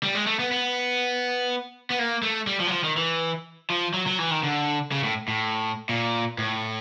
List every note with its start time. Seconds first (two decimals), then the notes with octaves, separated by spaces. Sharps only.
0.03 G3
0.15 G#3
0.27 A3
0.39 B3
0.52 B3
1.90 B3
1.99 A#3
2.23 A3
2.47 G3
2.60 F3
2.67 F#3
2.72 F3
2.84 D#3
2.97 E3
3.70 F3
3.94 F#3
4.07 F#3
4.19 E3
4.31 D#3
4.43 D3
4.92 C#3
5.04 A2
5.28 A2
5.89 A#2
6.38 A2